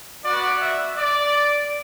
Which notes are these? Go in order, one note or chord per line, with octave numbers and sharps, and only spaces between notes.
B3 F#4 D5
E5
D5